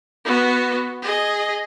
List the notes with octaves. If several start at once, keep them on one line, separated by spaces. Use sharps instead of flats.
B3 F#4
G#4 D#5